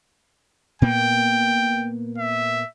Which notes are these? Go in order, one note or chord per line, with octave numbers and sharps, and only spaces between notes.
A#2 A#3 B3 G5
E5